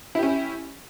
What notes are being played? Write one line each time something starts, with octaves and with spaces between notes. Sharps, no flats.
C#4 E4 G4